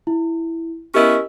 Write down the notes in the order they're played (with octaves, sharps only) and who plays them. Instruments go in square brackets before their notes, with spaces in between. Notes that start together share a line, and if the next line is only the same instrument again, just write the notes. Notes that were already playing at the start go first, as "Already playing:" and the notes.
[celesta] E4
[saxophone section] B3 C#4 E4 [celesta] G4 A#4 D#5